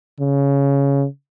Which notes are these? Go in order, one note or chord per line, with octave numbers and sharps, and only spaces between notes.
C#3